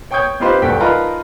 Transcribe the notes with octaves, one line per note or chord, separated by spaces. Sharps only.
C#5 G5 C#6 D#6 G6 G#6
C4 D#4 F4 G4 B4 C5
D1 G2 F#4 A4 G5 B6
D#4 F4 A#4 B4 A5 A#5